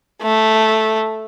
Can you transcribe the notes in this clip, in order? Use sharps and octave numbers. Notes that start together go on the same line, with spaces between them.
A3